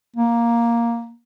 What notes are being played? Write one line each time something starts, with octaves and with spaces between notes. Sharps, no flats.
A#3